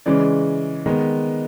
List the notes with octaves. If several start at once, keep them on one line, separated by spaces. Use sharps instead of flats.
C#3 E3 G#3 C#4 D5
D#3 G#3 B3